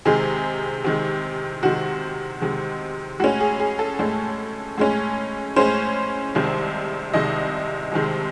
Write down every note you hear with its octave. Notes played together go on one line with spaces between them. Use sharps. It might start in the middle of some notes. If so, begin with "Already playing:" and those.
C3 D#3 G#3 G#4
C3 D#3 G#3
C3 D#3 G#3 F#4
C3 D#3 G#3
A2 G#3 C#4 F#4
G#4
G#4
A4
A2 G#3 C#4
A2 G#3 C#4
A2 G#3 C#4 C5
C2 C3 D#3 G#3
C2 C3 D#3 G#3 D#5
C2 C3 D#3 G#3